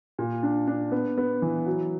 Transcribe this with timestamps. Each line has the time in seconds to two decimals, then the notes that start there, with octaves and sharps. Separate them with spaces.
0.19 A#2
0.43 D4
0.67 D4
0.92 B3
1.18 B3
1.42 E3
1.66 F#3